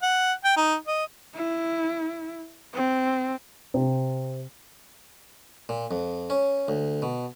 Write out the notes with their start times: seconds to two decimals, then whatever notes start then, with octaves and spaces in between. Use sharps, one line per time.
0.02 F#5
0.44 G5
0.56 D#4
0.87 D#5
1.35 E4
2.74 C4
3.74 C3
5.69 A#2
5.91 F2
6.30 C#4
6.68 D2
7.02 B2